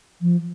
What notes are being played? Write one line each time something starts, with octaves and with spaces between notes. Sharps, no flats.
F3